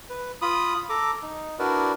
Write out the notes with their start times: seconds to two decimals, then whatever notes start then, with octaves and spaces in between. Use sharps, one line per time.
0.10 B4
0.42 F4 B5 D#6
0.90 A4 A#5 D6
1.22 D#4
1.59 D4 E4 F#4 A#4 B4 D5